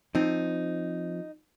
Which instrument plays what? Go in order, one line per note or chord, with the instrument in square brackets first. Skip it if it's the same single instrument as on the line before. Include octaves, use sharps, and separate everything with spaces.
[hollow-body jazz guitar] F3 C4 [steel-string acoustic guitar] D#4